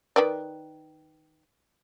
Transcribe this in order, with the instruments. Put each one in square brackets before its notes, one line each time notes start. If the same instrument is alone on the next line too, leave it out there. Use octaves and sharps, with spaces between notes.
[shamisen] D#3 B4 D5